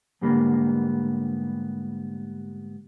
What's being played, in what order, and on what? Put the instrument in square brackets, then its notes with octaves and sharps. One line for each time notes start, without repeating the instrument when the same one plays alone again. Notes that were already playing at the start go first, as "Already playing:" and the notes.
[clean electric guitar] G#2 D3 G3 A#3 B3